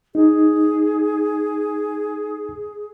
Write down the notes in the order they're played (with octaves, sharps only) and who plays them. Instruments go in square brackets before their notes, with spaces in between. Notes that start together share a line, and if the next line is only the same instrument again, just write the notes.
[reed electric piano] D#4 [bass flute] G#4